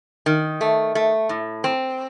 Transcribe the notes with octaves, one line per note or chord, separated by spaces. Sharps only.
D#3
A3
A3
A2
C4